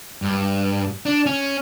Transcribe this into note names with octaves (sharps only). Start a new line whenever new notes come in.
G2
D4
C#4